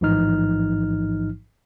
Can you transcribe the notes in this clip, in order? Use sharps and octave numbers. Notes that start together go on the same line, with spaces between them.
A1 G#2 E3 F3 D#4 F6